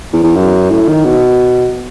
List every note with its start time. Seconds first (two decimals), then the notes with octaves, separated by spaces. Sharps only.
0.13 E2
0.23 E2
0.36 F#2
0.70 A2
0.88 D#3
1.05 B2